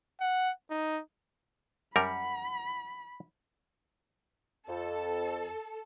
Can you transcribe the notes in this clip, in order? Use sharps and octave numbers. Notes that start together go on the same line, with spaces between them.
F#5
D#4
F#2 G3 A#4 F#5 B5
F2 A4